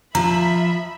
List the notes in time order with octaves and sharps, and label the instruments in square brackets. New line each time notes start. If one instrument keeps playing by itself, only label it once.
[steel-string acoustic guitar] F3 [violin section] E5 B5 [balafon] A#5